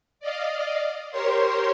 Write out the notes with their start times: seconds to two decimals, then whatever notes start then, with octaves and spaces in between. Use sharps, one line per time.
0.20 D5 D#5 F5
1.10 G4 A#4 C5 C#5 C6